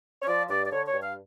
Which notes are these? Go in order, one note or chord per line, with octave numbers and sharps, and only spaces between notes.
C#5
F3 D5
G2 D5
D5
D3 C#5
C#5
G2
F5